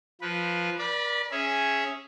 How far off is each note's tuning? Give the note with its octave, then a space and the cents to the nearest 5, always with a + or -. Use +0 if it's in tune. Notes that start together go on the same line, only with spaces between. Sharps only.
F3 +0 B4 -10
A#4 +45 D5 +0 B5 -20
C#4 -5 G#4 +0 E5 +0